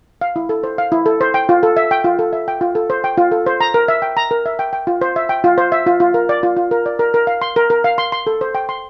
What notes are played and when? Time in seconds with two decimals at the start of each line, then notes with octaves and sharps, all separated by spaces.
0.21 F5
0.36 E4
0.49 A4
0.64 C5
0.78 F5
0.92 E4
1.06 A4
1.21 C5
1.34 G5
1.49 F4
1.63 A4
1.77 E5
1.91 G5
2.04 F4
2.19 A4
2.33 E5
2.48 G5
2.61 F4
2.75 A4
2.90 C5
3.04 G5
3.18 F4
3.32 A4
3.46 C5
3.61 A#5
3.74 A#4
3.88 E5
4.02 G5
4.17 A#5
4.31 A#4
4.46 E5
4.59 G5
4.73 G5
4.87 F4
5.01 C5
5.16 E5
5.29 G5
5.44 F4
5.58 C5
5.72 E5
5.87 F4
6.00 F4
6.14 A#4
6.29 D5
6.43 F4
6.56 F4
6.71 A#4
6.86 D5
6.99 A#4
7.14 A#4
7.27 F5
7.42 C6
7.56 A#4
7.70 A#4
7.84 F5
7.98 C6
8.12 C6
8.27 A4
8.41 C5
8.55 G5
8.69 C6